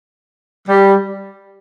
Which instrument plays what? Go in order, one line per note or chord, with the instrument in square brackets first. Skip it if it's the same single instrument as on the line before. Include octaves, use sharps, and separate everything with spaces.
[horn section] G3